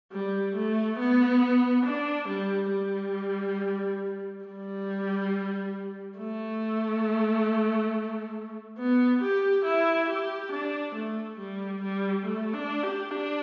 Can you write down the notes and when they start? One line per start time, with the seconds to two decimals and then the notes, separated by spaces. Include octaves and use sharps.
0.12 G3
0.56 A3
0.99 B3
1.86 D4
2.28 G3
2.72 G3
4.46 G3
6.18 A3
8.78 B3
9.22 G4
9.65 E4
10.09 G4
10.52 D4
10.95 A3
11.39 G3
11.82 G3
12.25 A3
12.54 D4
12.83 G4
13.11 D4